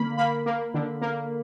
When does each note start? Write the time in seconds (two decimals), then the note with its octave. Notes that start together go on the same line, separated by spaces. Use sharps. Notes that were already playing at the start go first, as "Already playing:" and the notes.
Already playing: D3 A#3 B5
0.17 A#3 B5
0.46 A#3
0.74 D3
1.02 A#3